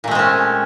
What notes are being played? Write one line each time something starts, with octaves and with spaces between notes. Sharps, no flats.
A#2 G#3 A3 C4 C#4